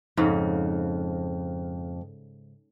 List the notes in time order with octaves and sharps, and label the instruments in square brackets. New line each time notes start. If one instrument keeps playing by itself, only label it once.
[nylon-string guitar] F2 [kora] G#2 C#3